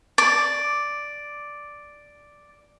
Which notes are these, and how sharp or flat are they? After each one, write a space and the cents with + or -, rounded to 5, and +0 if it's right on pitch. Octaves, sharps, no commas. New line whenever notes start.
D5 +0